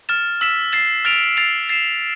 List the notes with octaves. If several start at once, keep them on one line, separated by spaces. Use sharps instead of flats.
F6 A6 E7
E6 B6 E7
A6 C7 E7
F6 A6 D7 F7
A6 C7 F7
A6 C7 E7